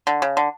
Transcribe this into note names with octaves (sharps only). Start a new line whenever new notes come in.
D3
C#3
D3